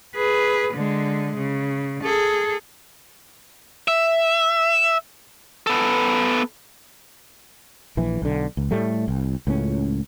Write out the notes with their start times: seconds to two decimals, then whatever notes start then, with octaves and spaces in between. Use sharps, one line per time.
0.15 G#4 B4
0.74 D3 G#3
1.37 C#3
2.03 G#4 A4
3.88 E5
5.67 B3 A4
7.97 A#1 E3
8.22 B1 D3
8.57 C#2
8.71 A2 G3 A3
9.08 C2
9.47 C#2 A2 C#4